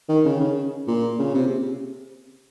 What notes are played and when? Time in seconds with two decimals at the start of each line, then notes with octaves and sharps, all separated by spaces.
0.09 D#3
0.25 C#3
0.40 C#3
0.87 A#2
1.19 C#3
1.34 C3